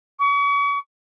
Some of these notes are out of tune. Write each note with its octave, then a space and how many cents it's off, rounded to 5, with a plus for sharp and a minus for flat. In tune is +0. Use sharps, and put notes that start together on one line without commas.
C#6 +40